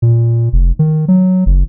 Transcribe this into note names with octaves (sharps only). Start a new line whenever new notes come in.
A#2
F1
D#3
F#3
F#1